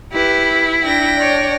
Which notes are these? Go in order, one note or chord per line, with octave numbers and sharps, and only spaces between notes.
E4 G4 B4
D4 G5 A#6
C#5 D5